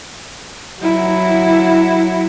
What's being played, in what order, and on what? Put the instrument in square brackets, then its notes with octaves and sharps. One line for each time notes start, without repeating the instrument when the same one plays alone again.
[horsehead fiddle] F#3 E4